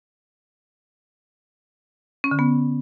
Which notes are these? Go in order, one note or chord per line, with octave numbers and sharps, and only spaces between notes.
C#4
D3
B3